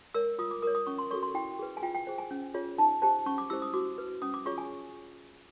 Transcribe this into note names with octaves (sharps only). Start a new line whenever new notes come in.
A#4 C#5 E6
F4 D#6
D6
A#4 C#5 D#6
D#6
C#4 C#6
C6
F#4 A4 C#5 C#6
C6
E4 G5
G#4 B4
G#5
F4 G5
G5
G#4 C5
G#5
C#4
F4 G#4 C#5
D#4 A5
G4 C5 A5
C#4 C#6
D6
E4 G4 C5 E6
D#6
F#4 D6
B4
C#4 D#6
D6
F4 G#4 C#5 C#6
G#5